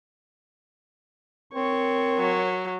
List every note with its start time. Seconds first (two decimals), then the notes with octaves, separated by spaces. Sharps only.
1.54 C4 A#4 C#5 C#6
2.19 F#3